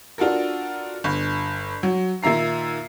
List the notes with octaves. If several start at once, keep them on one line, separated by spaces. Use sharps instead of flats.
D4 F4 F#4 A4 A#4
G1
F#3
A#2 D#3 E5 A#5 C7